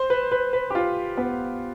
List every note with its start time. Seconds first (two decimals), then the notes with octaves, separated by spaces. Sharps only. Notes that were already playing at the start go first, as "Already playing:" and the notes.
Already playing: C5
0.10 B4
0.32 B4
0.53 B4
0.70 G4
0.75 F4
1.17 B3